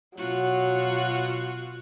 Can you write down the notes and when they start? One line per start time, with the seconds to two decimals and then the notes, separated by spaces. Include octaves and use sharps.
0.18 B2 F#3 F4 F#4